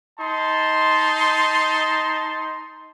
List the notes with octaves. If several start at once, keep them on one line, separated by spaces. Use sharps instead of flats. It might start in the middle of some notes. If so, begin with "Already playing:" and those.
D#4 A5 C6